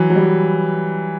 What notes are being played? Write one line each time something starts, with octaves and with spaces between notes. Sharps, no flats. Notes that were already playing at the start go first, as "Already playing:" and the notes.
Already playing: E3 F#3
F#3
G3